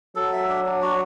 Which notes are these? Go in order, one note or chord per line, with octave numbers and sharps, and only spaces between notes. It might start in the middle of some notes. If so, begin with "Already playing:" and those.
F#3 A4
E5
D4
D4
F#4